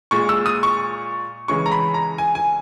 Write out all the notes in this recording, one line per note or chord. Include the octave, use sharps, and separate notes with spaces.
A#2 G#3 C#6
E6
D#6
C#6
C#3 E3 G#3 C#6
A#5
B5
A#5
G#5
G#5